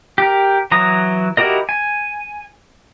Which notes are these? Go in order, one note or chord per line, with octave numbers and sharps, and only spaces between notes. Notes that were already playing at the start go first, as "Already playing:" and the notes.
G4 A#4
E3 F#3 A#5 D#6
E4 F#4 G4 A#4 D#5
G#5